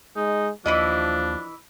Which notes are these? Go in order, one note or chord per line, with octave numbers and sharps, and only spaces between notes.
G#3 D#4
D#2 E3 F3 D4 E4 D#5